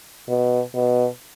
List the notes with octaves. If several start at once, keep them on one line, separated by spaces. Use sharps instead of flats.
B2
B2